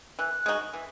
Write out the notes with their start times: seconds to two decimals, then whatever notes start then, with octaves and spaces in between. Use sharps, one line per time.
0.19 E3 F#6
0.46 G#3 D#4 F#4
0.73 E3